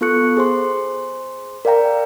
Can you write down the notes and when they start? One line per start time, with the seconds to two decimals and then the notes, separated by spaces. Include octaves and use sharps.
0.01 B3 F4 A4 C#6 F#6 C#7
0.37 G#4 C5 C6
1.65 A#4 D5 F5 G5 A#5